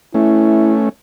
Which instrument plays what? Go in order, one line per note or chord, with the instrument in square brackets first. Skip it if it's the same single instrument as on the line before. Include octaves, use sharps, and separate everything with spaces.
[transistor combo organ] A3 C#4 [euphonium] E4